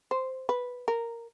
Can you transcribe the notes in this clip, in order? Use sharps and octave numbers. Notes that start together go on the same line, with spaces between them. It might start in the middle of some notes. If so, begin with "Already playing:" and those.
C5
B4
A#4